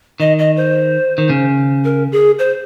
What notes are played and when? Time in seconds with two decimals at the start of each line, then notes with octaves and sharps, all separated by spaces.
0.20 D#3 D#5
0.39 D#5
0.56 C5
1.18 D#3
1.30 C#3
1.84 A#4
2.12 G#4
2.39 C5